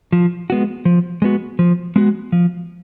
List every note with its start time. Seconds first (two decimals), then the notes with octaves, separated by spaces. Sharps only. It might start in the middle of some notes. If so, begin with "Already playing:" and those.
0.12 F3
0.50 G#3 B3 F#4
0.85 F3
1.22 G#3 B3 F#4
1.59 F3
1.96 G#3 B3 F#4
2.32 F3